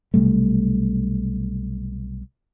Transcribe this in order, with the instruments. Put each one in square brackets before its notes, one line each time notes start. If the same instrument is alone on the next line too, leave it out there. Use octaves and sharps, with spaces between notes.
[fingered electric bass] B1 C3 G3 A3